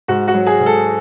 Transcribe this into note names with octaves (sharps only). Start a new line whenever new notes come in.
G#2 F#4
F#4
F#3
G#4
G#2
A4